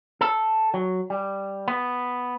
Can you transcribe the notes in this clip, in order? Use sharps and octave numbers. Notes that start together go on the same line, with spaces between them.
A4
F#3
G3
B3